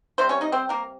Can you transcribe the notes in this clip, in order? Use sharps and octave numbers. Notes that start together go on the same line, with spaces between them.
C3 G3 C5
C#4 C#5
D#4 D#5
C4 C5
A#3 A#4